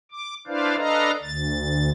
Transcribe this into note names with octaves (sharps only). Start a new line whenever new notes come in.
D6
D4 E4 B4 C5 D5 F5
D4 A4 B4 D#5 F5 A#5
D2 A6